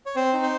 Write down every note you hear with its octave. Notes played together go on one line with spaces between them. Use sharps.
C#5
C4 C5
D#4
C5